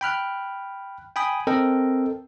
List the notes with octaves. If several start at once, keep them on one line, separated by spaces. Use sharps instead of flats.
G5 B5 F6 F#6
G5 G#5 B5 D#6
C4 A4 A#4 D#5 G5